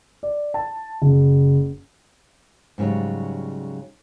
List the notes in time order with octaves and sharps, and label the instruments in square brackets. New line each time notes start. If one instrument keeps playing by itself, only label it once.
[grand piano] D5
A5
F#1
[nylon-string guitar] G#2 C#3 E3 F#3 G3